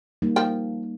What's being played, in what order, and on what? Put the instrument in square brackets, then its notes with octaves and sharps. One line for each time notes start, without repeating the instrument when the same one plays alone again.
[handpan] G3 A#3 D#4
[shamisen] F3 A#4 G5